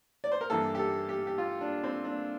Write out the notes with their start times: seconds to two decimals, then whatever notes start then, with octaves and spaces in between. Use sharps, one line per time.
0.24 D5
0.32 C5
0.41 A#4
0.50 G2 E3 A#3 A4
0.75 G4
0.79 A4
1.09 G4
1.27 G4
1.38 F4
1.61 D4
1.84 C4
2.05 D4